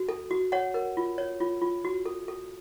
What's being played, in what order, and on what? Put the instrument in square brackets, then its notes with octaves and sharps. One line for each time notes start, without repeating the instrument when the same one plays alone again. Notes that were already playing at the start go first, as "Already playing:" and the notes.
Already playing: [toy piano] F#4
A4
F#4
C#5 F#5
A#4
F4
C#5
F4
F4
F#4
A4
A4